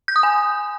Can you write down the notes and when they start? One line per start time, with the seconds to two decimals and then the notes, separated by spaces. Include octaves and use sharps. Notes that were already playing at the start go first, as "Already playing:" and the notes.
0.08 G6
0.16 D#6
0.23 G#5